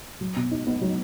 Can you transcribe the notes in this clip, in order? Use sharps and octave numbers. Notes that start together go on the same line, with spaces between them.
F#3
B2
D#4
B3
F#3